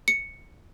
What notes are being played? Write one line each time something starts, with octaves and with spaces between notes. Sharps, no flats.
C#7